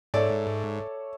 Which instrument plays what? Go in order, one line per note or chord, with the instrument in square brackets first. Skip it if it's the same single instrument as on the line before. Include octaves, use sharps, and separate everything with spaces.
[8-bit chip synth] G#2 [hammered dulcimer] A4 C#5 E5 [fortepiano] D5